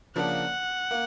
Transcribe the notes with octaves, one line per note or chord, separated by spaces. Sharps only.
C#3 F3 A#3 D4 F#5
A#3